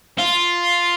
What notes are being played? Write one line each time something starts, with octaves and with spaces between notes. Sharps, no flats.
F4